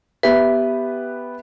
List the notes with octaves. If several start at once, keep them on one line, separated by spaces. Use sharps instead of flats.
B3 G4 B4 E5